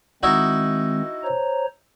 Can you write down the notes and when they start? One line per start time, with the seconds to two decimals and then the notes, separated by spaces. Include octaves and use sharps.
0.23 D#3 G#3 C4 D#4 E4 F#4
1.24 C5 C#5 A#5